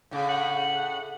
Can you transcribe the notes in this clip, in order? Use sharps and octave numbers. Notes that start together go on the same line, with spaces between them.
A2 C#3
F#5